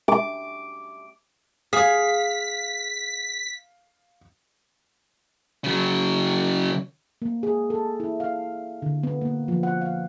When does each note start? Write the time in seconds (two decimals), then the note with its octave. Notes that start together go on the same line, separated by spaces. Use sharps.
0.08 D6
1.73 G#4 F5 B6
5.64 C#3 F#3
7.22 A#3
7.43 G#4
7.70 A4
8.00 E4
8.20 F5
8.82 D3
9.03 B3
9.21 A#3
9.48 F3
9.63 F#5
9.81 F5